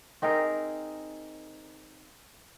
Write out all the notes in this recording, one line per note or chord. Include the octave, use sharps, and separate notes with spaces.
C4 D#4 G#4 A#4